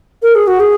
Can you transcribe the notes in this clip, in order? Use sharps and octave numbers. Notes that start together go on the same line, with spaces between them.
A#4
G#4
F#4
G#4